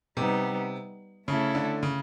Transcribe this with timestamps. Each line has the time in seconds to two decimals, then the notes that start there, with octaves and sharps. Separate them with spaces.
0.17 C3 G3 B3 D#4
1.27 C#3 A3 C#4 E4 A4
1.55 D3
1.83 C#3